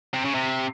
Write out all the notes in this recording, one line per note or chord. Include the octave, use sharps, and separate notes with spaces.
C3
C#3
C3